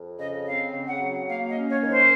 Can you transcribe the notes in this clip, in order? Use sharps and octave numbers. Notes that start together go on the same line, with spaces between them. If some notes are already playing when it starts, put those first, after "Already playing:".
Already playing: F2
C#3 D#5
C4 F5
C#3
F#5
F#3
A#3 F5
D#5
C#4
C#5
D#3
C5